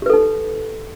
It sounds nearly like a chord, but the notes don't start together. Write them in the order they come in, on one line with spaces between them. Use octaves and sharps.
G4 B4 A4 D#4